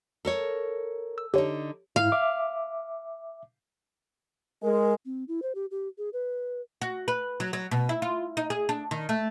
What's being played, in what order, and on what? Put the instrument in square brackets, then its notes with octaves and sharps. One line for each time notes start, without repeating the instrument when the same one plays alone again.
[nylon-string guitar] A4 A#4 C#5
[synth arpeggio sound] E6
[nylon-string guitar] D3 D#4 [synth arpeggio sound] G4 C#5
[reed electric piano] G#2 E4 [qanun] F5
[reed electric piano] E5 D6
[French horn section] G#3 [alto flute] A#4
[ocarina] C4
E4
C5
G4
G4
G#4
B4
[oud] F#4
B4
F#3
F#3
B2
E4
F4
D#4
G#4
D4
D#3
A3